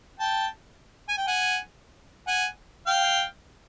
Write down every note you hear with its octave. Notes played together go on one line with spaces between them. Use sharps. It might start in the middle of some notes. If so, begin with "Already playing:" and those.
G5 A5
G#5
G5
F#5 G#5
F#5 G#5
F5 G5